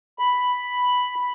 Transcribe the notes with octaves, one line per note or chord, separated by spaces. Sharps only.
B5